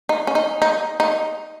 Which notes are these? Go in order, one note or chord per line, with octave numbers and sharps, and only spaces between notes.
D#4
C#4
D#4
D#4
D#4